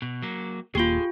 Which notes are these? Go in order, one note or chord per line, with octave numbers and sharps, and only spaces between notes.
B2
F#3 A#3
D#1 A#3 F4 G4 G#4 C6